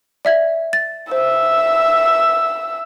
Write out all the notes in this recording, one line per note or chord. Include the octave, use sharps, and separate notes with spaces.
D5 E5 G#6
A6
C5 E5 E6